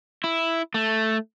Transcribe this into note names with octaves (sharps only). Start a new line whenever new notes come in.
E4
A3